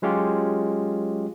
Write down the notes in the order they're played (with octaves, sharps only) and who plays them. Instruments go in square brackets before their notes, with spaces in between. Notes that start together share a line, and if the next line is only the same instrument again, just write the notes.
[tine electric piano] F#3 G#3 C#4 F4 G4